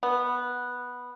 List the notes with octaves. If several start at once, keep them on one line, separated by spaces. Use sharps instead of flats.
B3